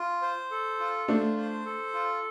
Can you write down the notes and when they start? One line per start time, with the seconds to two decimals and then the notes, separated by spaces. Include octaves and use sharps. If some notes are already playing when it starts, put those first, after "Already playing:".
Already playing: F4
0.22 C5
0.51 A4
0.80 F4
1.08 A3 D4 C5
1.37 C5
1.66 A4
1.94 F4